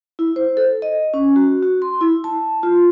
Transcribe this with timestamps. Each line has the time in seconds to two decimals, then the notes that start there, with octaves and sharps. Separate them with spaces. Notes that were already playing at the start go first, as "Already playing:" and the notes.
0.19 E4
0.36 C5
0.57 A4
0.82 D#5
1.14 C#4
1.36 F#4
1.63 F#4
1.82 C6
2.01 E4
2.24 A5
2.63 F4